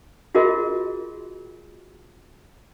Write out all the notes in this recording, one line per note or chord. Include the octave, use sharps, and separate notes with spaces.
F4 F#4 G#4 A#4 D#5